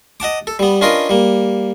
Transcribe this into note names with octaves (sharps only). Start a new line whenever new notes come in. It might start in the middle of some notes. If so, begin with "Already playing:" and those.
D#5 F#5 A5 D6
A4
G3 B3
C#4 D4 F4 A#4 B4 D#5
G3 A#3